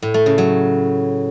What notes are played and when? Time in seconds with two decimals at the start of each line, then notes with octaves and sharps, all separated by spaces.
0.02 A2
0.14 A3
0.26 C#3
0.38 F#3